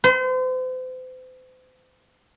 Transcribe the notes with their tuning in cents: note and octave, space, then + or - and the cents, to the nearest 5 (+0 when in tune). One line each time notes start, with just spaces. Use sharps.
C5 -40 C6 +0